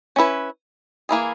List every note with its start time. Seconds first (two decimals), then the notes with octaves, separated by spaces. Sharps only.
0.16 C#4 E4 B4
1.09 E3 A#3 E4 G#4